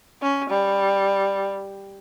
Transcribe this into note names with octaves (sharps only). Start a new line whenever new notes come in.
C#4
G3